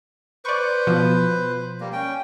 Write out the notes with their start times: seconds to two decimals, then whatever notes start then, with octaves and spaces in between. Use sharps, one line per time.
0.45 B4 C5 D5 C#6
0.87 B2 F3
1.80 G3 A#3
1.93 C#4 G5